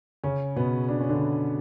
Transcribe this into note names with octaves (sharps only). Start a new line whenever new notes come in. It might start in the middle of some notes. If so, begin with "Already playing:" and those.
C#3 C#4
B2 B3
D4
C#4
D3 D4